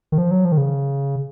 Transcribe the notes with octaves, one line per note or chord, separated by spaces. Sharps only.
D#3
F3
F#3
F3
D#3
C#3